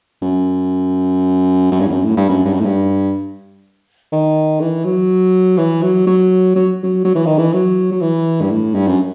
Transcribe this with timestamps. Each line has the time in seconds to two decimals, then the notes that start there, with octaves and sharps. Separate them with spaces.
0.22 F#2
1.72 F#2
1.80 G2
1.87 E2
1.92 F#2
2.05 A2
2.17 G2
2.29 F#2
2.45 G2
2.53 F#2
2.60 A2
2.65 G2
4.12 D#3
4.60 E3
4.85 F#3
5.58 E3
5.83 F#3
6.07 F#3
6.56 F#3
6.83 F#3
7.05 F#3
7.15 E3
7.26 D#3
7.38 E3
7.53 F#3
7.92 F#3
8.01 E3
8.41 G2
8.51 A2
8.74 G2
8.87 F#2